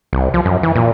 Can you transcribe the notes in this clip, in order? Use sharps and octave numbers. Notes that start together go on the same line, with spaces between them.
C2
F3
F#2
E3
A#2